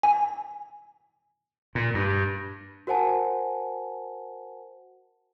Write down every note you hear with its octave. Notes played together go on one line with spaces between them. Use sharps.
G#5
A#2
G2
F#4 A#4 C5 F#5 G#5 A5